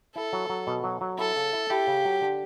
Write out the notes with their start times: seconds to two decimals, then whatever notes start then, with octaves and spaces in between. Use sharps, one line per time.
0.15 E4 A4
0.33 F#3
0.50 F#3
0.67 B2
0.84 F#3
1.01 F#3
1.19 E4 A4
1.36 C#3
1.53 E4
1.70 E4 G4
1.87 C#3
2.05 F#3
2.21 D3